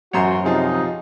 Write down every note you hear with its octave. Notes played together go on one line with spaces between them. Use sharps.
A1 F#2 F#4 C5 C#5 A#5 C6
C3 F3 D#4 F4 G#4